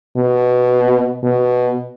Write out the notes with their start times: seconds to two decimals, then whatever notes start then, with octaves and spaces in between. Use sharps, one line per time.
0.17 B2
1.23 B2